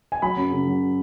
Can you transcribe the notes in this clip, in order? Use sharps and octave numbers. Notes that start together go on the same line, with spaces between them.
G#5
F#3 B5
F#2
C#3
F#3